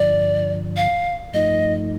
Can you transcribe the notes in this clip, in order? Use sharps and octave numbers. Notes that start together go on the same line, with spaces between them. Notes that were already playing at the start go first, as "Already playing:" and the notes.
Already playing: G2 D3 F3 D5
F5
G2 F3 A3 D#4 D#5